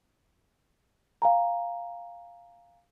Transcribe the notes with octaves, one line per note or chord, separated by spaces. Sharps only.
F5 G#5 A#5